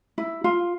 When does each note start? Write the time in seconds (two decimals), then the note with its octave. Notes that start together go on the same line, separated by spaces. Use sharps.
0.18 E4
0.44 F4